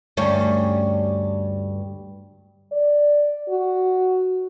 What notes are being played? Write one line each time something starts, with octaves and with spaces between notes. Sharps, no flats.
D2 G2 C#4
D5
F#4